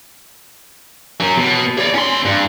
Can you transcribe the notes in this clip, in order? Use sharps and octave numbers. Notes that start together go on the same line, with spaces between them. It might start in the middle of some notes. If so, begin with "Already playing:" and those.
F#3 C#4
B2
C#5 D5
C#4 C6
G2